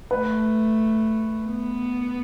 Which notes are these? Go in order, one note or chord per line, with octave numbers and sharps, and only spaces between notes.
A3 B4
B3